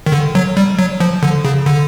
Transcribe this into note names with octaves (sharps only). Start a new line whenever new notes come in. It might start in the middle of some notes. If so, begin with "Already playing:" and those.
D#3
D3
F#3
G3
F#3
F3
D3
C#3
D3